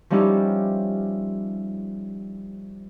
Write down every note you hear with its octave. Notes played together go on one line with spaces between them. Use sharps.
F3 G3 C#4 D#4 E4 G4